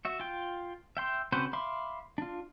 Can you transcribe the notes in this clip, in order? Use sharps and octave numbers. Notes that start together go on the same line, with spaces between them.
F#4 E5
F4 G5
E5 G5 C6
C#3 C4 F#4 B4 C5
E5 F5 B5 C6 D6
D4 F4